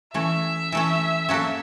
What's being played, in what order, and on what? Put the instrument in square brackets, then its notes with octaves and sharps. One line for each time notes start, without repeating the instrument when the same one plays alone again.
[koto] E3 A3 C#4 [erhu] E5
[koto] E3 A3 C#4
F#3 A#3 C#4 F#4 A4